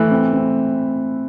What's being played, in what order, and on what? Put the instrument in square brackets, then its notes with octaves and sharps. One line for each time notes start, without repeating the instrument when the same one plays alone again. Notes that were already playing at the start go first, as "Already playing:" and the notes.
Already playing: [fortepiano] E3 [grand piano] A3
[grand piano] C4
C4